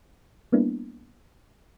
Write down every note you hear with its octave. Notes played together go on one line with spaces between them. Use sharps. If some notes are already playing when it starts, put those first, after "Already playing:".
G3 A#3 B3 D4 E4